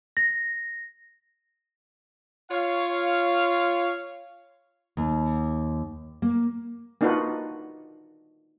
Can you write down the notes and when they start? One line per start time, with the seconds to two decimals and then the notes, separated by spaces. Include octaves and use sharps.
0.17 A#6
2.51 F4 C#5 F5
4.97 D#2
6.22 A#3
7.01 A#3 D4 D#4 F4 F#4 B4